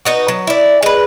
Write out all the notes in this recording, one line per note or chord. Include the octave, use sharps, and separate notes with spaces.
B3 D#4 F#4
F#3
E4 D5
G#3 B4